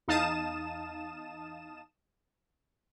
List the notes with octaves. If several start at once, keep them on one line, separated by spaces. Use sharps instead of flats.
E2 D#4 F5 A5 D#6 E7